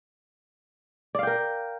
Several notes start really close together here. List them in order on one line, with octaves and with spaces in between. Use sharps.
D5 F5 G5 A#4